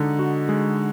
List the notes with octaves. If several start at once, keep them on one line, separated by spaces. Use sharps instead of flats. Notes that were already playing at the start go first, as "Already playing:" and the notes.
Already playing: D3 G#3 D#4 F#4
F#4
G#3